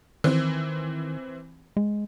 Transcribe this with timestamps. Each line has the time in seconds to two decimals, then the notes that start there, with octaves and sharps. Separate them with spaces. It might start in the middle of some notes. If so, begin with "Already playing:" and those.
0.24 D#3 E3 C4
1.77 G#3